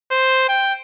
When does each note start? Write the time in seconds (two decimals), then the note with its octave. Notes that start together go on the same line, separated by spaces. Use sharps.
0.11 C5
0.49 G5